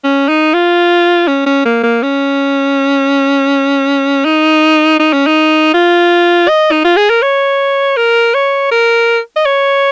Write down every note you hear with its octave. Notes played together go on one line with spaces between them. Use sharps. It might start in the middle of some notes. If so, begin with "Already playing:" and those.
C#4
D#4
F4
C#4
C#4
A#3
A#3
C#4
D#4
D#4
C#4
D#4
F4
D#5
D#4
F4
G#4
A#4
C#5
A#4
C#5
A#4
D#5
C#5